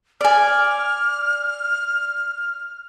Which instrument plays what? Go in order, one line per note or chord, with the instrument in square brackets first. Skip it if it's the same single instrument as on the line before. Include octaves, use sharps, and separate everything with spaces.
[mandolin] D5 G#5 [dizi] F6